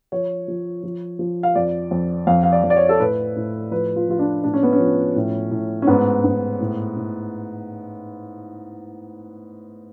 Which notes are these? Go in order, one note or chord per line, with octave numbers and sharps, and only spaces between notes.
F3 C#5
F3
F3
F3
F5
F2 D5
F2
F2 F5
F5
D5
F2
D5
C#5
A4
A2 B4
A2
F3 B4
F4
F3 F4
D4
A2 D4
C#4
B3
C#4
F3
A2
A2
C#4
G#2 B3
G#2
A2
A2